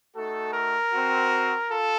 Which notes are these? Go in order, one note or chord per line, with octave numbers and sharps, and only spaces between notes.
A3 D#4 F#4 A4
A#4
C4 F#4
F4 A4